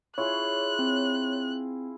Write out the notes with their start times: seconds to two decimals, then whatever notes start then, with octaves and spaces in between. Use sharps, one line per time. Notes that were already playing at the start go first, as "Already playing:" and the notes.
0.18 E4 F4 G#4 C#5 F#6
0.79 C4